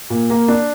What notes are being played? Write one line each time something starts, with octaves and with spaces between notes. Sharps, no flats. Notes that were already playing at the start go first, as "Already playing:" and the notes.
A#2
A#3
D4